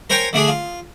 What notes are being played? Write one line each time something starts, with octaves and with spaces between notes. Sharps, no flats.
A#4 C5 C#5 G5 G#5 A#5
D3 A3 D4 G#4
F4